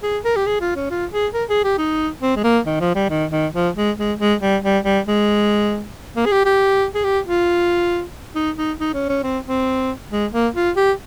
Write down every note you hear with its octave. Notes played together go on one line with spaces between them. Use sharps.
G#4
A#4
G4
G#4
F4
C#4
F4
G#4
A#4
G#4
G4
D#4
C4
G#3
A#3
D#3
F3
G3
D#3
D#3
F3
G#3
G#3
G#3
G3
G3
G3
G#3
A#3
G#4
G4
G4
G#4
G4
F4
D#4
D#4
D#4
C#4
C#4
C4
C4
G#3
A#3
F4
G4